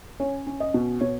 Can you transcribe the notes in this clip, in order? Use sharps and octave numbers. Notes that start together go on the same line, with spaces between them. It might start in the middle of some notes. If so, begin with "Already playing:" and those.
C#4 C#5
C#4
D#5
B2
B2 C#5